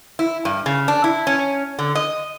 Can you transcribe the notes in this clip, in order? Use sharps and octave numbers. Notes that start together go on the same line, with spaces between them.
E4
G2
C#3
D4
E4
C#4
D3
D#5